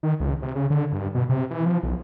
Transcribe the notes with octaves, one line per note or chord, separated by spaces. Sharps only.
D#3
C#2
C3
C#3
D3
G2
B2
C3
E3
F3
B1